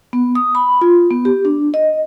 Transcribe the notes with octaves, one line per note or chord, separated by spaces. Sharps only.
B3
D#6
B5
F4
B3
G4
D4
D#5